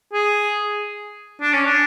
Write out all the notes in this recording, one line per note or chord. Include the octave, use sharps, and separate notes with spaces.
G#4
D4
C#4
D4